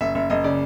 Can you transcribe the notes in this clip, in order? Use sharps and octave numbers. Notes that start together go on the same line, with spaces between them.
F#1 E5
F#1 E5
F#1 D#5
C#3 D5